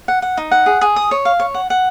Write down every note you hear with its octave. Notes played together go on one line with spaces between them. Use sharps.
F#5
F#5
D#4
F#5
G#4
G#4
D#6
C#5
F5
C#5
F#5
F#5